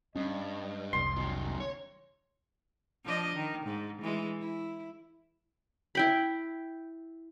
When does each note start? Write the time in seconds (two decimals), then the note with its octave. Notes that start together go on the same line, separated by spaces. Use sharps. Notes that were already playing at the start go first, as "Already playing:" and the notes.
0.15 G2 C#4 D#5
0.93 F1 C2 C6
1.16 D#3 F#3
1.60 C#5
3.04 F3 D4 D#5
3.36 D#3
3.66 G#2
4.02 E3 G#3
4.40 E4
5.95 E4 G5 B5